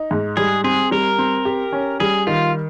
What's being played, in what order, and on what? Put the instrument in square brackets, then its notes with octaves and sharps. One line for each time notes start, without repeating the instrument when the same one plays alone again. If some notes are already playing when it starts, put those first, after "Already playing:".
Already playing: [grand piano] D#4
G#2
[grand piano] G3 [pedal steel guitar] G#4
[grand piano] C4 [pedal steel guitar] G#4
[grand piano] G3 [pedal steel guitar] A#4
[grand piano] C4
G4
C#4
[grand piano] G3 [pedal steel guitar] G#4
[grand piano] D#3 [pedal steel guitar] F4